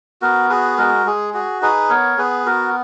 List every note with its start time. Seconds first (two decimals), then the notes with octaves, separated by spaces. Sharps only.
0.22 B3 F#4 A#4
0.49 F#4 G#4 B4
0.77 G#3 F#4 A#4
1.06 G#3 G#4
1.34 F#4 G#4
1.62 D#4 G#4 B4
1.90 B3 A#4 C#5
2.17 B3 G#4 B4
2.46 B3 F#4 A#4